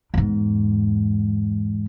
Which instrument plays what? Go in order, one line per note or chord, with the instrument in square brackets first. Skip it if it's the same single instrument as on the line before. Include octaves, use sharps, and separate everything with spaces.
[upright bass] E2 G#2